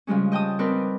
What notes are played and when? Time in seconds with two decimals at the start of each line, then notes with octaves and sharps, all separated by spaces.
0.07 C#3 F3 G3 G#3 C#4
0.32 D#5 G5 A5 D#6
0.59 C4 D#4 A#4 B4 D5